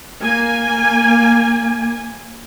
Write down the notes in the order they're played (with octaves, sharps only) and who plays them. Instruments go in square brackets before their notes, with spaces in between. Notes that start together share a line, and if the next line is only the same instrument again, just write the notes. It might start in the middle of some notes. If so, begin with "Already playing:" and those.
[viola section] A#3 G#5